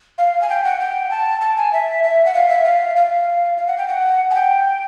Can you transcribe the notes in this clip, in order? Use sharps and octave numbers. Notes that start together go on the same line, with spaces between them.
F5
G#5
G5
F#5
G5
A5
A5
G#5
E5
E5
F#5
F5
E5
F5
F5
F5
F#5
G5
F#5
G#5
G5